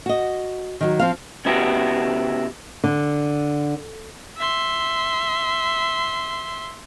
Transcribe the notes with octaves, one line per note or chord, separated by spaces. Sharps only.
F#4 D#5
D#3 F#3
F3 C4 F5
C#3 B3 E4 F#4 G4
D3
E5 C6